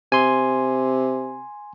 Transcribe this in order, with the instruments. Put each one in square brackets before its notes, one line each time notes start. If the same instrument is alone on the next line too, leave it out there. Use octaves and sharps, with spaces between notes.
[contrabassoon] C3 [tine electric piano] G#5 C6